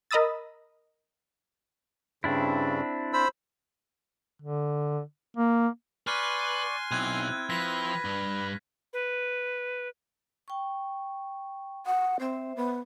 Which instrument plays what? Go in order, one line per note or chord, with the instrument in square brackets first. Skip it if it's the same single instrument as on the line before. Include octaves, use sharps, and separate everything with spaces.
[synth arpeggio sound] A#4 D#5 B5 D#6 E6 A6
[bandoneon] G2 C#3 [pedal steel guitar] C4 D4 E4
[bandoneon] C5 B5 E6
[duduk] D3
A#3
[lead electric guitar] B4 [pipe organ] D5 C#6 [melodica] G#5 C6 [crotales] F6 F#6 D#7
[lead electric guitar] B1 [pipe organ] C4 E4 [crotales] F#6 G#6 D#7
[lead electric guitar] F3 [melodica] B4 [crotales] A#6 B6
[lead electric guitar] G2
[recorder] B4
[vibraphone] G5 C#6
[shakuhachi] F#5 [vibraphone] D#6
[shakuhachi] C4 [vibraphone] C5 E5
[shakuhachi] B3